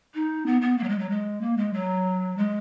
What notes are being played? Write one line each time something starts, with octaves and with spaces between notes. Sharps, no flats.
D#4
B3
B3
A#3
F#3
G#3
F#3
G#3
A#3
G#3
F#3
G#3